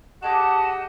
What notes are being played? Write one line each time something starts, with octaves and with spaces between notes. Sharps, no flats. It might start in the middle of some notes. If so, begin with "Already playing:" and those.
D4 G4 G#4 D#5 F#5 A5 D6